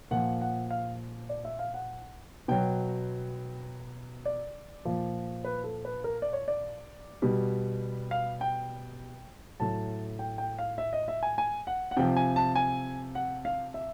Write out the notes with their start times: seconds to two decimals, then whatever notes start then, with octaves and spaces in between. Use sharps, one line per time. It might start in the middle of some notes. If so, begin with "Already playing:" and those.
0.11 A#2 F3 F#5
0.41 F#5
0.70 F5
1.29 D5
1.45 E5
1.59 F5
1.74 F#5
2.48 B2 F#3 G5
4.25 D5
4.85 A#2 F3
5.44 B4
5.64 A4
5.85 B4
6.04 A#4
6.22 D5
6.33 C#5
6.48 D5
7.22 B2 G3
8.11 F5
8.41 G5
9.60 A2 F#3 A5
10.19 G5
10.38 G5
10.58 F5
10.78 E5
10.93 D#5
11.08 E5
11.23 G#5
11.38 G#5
11.67 F#5
11.91 F#5
11.97 C3 F3 G5
12.16 G#5
12.36 A5
12.55 G#5
13.15 F#5
13.45 F5
13.74 E5